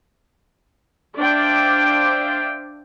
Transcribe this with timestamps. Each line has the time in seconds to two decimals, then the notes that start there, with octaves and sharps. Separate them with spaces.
1.18 D4 C5 D5 E5 F5 G5